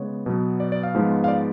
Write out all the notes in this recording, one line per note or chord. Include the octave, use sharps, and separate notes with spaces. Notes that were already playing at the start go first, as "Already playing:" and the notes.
Already playing: C#3 G#3 B3 C#5
B2 F#3 B3
D5
D5
F5
G#2 F3 G#3 B3
F5
D5